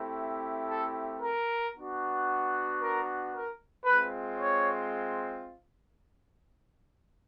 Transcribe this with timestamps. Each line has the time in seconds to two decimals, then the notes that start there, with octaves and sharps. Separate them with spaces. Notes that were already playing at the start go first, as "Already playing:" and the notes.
Already playing: A3 C4 E4 G4
0.69 A4
1.22 A#4
1.75 B3 D4 F#4
2.81 A#4
3.33 A#4
3.85 G#3 C4 F4 B4
4.39 C#5